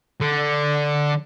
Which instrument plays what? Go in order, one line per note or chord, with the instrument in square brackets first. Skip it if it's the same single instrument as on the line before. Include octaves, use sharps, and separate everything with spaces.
[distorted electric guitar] D3